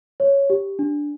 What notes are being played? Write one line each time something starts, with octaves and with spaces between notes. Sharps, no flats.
C#5
G4
D4